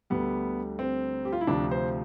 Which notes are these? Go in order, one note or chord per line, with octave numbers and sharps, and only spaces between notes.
D2 D3 G3 B3
C4
G4
F4
E4
D2 C3 F3 D4
C5